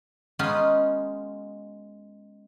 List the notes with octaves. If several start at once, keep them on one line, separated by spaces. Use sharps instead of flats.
G#3 B3 C#4 D#4 F4 F#4